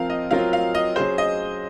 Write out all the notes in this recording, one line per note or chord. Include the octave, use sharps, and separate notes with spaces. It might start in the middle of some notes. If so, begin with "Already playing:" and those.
Already playing: F3 C4 F4 A#4 F5
D#5
F#3 C4 F4 A#4 F5
F5
D#5
F#3 C#4 G#4 C5
D#5